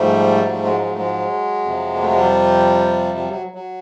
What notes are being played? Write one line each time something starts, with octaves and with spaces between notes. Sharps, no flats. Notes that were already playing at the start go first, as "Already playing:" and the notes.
Already playing: G#2 F3 G3 A3
F#3
G3
F#3 G#3
F#3 G#3
A3
F#3 G#3
F2 C3 F3
A#3
A3
G#3
G3
G3
F#3
F#3